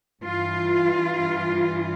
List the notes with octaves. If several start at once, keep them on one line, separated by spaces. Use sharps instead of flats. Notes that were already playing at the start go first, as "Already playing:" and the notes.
G2 E3 F4